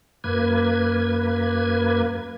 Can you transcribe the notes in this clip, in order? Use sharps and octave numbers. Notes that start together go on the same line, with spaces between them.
F#2 A#3 B4 G#6